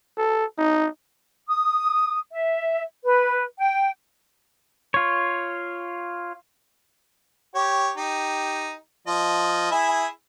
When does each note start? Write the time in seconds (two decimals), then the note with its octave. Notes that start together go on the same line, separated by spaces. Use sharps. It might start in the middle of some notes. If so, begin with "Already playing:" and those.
0.18 A4
0.58 D#4
1.47 D#6
2.32 E5
3.04 B4
3.58 G5
4.94 F4 C#5
7.55 G4 C#5
7.97 D#4 G4
9.07 F3 D#5
9.71 E4 G#4 E5